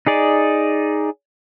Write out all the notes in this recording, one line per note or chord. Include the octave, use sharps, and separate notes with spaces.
D#4 G#4 D5